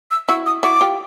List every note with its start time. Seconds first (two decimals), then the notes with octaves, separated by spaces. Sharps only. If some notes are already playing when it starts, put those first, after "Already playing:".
0.11 E6
0.28 E4 F#4 E6
0.46 D#6
0.63 E4 F#4 D6
0.81 F4 G4